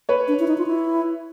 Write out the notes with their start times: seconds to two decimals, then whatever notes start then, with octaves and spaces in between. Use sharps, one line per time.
0.09 B4 C#5
0.28 D4
0.39 E4
0.48 D#4
0.58 F4
0.66 E4